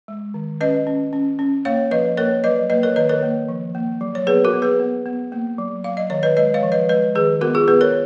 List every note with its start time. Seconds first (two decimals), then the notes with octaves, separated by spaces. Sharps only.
0.08 G#3
0.34 D#3
0.61 C#4 B4 D#5
0.87 C#4
1.13 C#4
1.39 C#4
1.65 A#3 C#5 F5
1.91 F3 B4 D#5
2.17 A#3 A#4 C#5
2.44 F#3 B4 D#5
2.70 A#3 B4 D#5
2.83 A#4 C#5
2.96 D#3 B4 D#5
3.09 A#4 C#5
3.22 A#3
3.49 F3
3.75 A#3
4.01 F#3
4.15 C#5
4.27 B3 G#4 B4
4.44 F#4 A#4
4.53 B3
4.62 G#4 B4
4.80 B3
5.06 B3
5.32 A#3
5.58 F#3
5.84 F#3 F5
5.97 D#5
6.10 D#3 C#5
6.23 B4 D#5
6.37 G#3 B4 D#5
6.54 C#5 F5
6.63 F3
6.72 B4 D#5
6.89 G#3 B4 D#5
7.15 D#3 G#4 B4
7.41 B3 F#4 A#4
7.55 F4 G#4
7.68 B3 G#4 B4
7.81 A#4 C#5